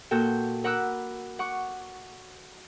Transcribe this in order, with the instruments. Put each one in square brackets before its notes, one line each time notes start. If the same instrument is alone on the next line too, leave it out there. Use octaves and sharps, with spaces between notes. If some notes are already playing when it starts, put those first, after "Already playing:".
[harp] A#2 F#4 A4 G5
A#4 F#5 B5 D6 E6 F#6
F#5 C#6 D6